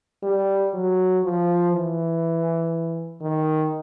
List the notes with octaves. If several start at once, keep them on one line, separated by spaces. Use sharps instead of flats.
G3
F#3
F3
E3
D#3